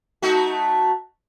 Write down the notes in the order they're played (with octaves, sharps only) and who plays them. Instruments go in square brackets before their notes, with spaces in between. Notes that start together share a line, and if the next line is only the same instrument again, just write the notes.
[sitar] A3 D#4 F#4